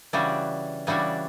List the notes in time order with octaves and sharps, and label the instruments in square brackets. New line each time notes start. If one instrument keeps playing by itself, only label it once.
[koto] C#3 E3 G3 D4 F#4
C#3 E3 G3 D4 F#4